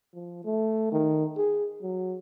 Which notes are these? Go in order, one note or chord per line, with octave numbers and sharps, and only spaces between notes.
F3
A3
D#3
G#4
F#3